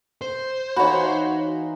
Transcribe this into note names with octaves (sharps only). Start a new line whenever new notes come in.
C5
E3 D#4 F4 F#4 C#5 B5